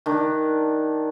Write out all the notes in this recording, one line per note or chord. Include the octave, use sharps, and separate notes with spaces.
D#3 D4